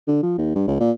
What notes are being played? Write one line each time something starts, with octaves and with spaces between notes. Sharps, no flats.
D3
F3
D#2
G2
C#2
A#2